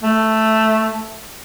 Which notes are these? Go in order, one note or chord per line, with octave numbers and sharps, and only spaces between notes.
A3